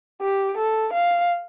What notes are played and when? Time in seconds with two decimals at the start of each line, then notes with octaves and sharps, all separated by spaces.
0.22 G4
0.57 A4
0.93 F5